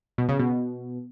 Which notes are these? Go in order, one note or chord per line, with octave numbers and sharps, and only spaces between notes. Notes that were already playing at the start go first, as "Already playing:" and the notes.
B2
C#3
B2